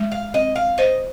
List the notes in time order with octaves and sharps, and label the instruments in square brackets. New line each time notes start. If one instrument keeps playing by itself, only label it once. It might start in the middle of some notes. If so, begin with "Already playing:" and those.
Already playing: [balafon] G#3
[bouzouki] F5
[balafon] C4 [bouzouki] D#5
[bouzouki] F5
[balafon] C5 [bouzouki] D#5